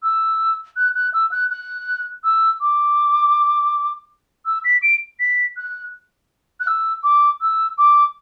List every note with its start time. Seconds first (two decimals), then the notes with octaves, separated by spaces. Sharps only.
0.03 E6
0.76 F#6
0.95 F#6
1.14 E6
1.32 F#6
1.50 F#6
2.24 E6
2.61 D6
4.46 E6
4.64 B6
4.82 D7
5.20 B6
5.57 F#6
6.60 F#6
6.67 E6
7.04 D6
7.41 E6
7.78 D6